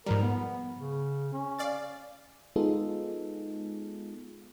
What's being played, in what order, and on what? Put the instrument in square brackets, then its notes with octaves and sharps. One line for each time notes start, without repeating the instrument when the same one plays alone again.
[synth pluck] G#2 F3 G3 [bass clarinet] A#4
[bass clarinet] B3
C#3
C#4
[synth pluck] D5 F5 A6
[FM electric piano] G#3 B3 D#4 F4 G#4 A4